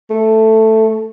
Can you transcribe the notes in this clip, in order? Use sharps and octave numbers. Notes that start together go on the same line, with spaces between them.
A3